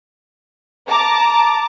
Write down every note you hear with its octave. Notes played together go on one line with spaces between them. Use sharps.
A5 A#5 D6